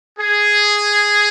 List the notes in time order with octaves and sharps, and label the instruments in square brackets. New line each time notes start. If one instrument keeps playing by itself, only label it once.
[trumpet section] G#4